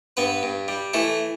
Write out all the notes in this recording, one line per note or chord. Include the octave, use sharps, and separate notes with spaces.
G2 B3 B4
G2
G3
E3 A3 A4